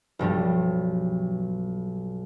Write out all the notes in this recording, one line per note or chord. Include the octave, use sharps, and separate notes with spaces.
B1 G2 F3 G3